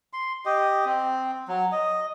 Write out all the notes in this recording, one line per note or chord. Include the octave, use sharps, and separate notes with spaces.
C6
G4 D#5
C4
F#3
D#5